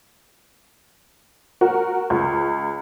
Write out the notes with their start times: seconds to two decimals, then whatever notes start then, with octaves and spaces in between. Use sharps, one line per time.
1.61 F#4 A#4
2.10 C#2